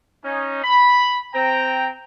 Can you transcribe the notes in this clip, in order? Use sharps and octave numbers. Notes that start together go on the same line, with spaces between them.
C#4 D#4
B5
C4 G5 A#5